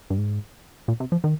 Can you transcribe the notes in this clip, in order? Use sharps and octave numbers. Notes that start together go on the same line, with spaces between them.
G2
G#2
A#2
C3
F3
D#3